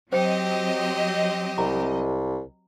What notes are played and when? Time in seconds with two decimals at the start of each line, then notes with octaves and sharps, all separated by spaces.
0.13 F#3 C4 G4 C5 D#5 G5
1.58 C2 A#5